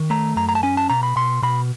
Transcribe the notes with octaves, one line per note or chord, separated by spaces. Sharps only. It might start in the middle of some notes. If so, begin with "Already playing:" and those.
Already playing: D#3
A3 A#5
F#2 A#5
A#5
A5
C#4 G#5
A5
B2 A#5
B5
B2 C6
B2 B5